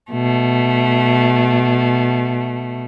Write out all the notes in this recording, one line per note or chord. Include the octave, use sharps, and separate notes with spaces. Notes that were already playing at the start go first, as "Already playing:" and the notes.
B2 A3